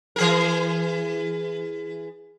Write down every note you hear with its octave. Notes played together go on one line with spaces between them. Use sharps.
E3 G#4 A#4